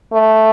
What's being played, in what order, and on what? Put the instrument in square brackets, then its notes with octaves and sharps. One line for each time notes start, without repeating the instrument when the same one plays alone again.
[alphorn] A3